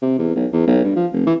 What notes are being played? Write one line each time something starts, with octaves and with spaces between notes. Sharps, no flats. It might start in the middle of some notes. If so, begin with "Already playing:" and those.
C3
E2
B1
E2
B1
G2
F3
F1
E3